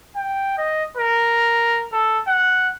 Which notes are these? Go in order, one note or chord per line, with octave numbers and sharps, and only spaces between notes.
G5
D#5
A#4
A4
F#5